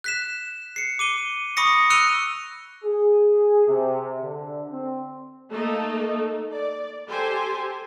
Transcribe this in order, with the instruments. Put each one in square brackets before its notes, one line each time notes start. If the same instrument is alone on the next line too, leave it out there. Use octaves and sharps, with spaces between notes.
[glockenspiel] F#6 B6 E7
C7 C#7
D6 D#7 G7
B5 C#6 D#6 A#6 C#7
E6 F#6 C#7 D#7 F7 G7
[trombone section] G#4
C3
D3
C4
[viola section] A3 A#3 D#4 A4
D5
G4 A4 C5 G#5